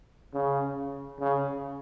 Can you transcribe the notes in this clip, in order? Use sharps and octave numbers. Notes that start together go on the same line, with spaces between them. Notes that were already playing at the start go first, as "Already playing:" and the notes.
C#3
C#3